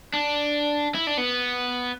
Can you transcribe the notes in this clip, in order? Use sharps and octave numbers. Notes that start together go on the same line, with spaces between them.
D4
E4
D4
B3